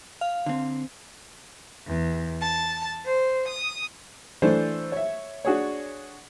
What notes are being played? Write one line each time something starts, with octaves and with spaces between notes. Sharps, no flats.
F5
D3 C4
E2
A5
C5
D#6
E3 A3 D4 C5
C#5 E5
D4 F#4 G#4 C#5